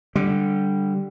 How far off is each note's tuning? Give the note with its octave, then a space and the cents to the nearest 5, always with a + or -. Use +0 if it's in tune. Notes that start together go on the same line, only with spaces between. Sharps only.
D3 +0 G3 +0